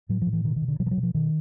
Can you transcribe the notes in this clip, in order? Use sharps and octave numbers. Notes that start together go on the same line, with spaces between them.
A2 F#3
A2 F3
E3
B2 D#3
D#3
B2
D3
B2 F#3
F3
F#3
B2
F3
B2 D#3